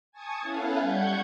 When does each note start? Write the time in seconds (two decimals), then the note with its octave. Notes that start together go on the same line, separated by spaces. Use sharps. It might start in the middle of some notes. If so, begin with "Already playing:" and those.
0.12 G#5 A5 C#6 D#6 G#6
0.41 B3 C#4 E4 A4 B4 F5
0.80 G3 F#5 C#6 G6 G#6